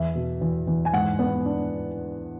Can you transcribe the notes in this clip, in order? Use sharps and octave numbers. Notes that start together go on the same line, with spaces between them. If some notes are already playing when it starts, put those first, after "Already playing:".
Already playing: E2 E5
B2
E2
E2
G#5
G#2 F#5
B3
D4